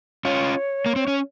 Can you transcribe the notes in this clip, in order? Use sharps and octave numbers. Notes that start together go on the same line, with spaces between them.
C#4 F4 C#5
A#3
C4
C#4